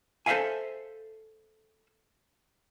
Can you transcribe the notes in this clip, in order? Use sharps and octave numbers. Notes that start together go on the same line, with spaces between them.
A4 C5 D5 E5 F5 G#5